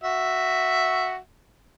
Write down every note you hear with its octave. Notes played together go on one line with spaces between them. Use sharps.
F#4 E5